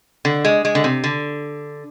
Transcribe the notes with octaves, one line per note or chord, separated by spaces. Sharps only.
D3
G#3
G#3
D3
C3
D3